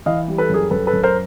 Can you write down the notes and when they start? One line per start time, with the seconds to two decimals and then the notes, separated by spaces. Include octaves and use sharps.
0.06 E3 D#5 F5
0.28 G3
0.38 A4 B4
0.49 F#2 G#4 A#4
0.71 F#2 A4 B4
0.87 A4 B4
0.93 F#2
1.03 A#4 C5